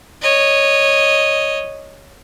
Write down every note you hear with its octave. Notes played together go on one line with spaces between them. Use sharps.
C#5 D#5